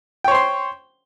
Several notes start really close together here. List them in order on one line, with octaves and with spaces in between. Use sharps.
G5 C#5 C5 C6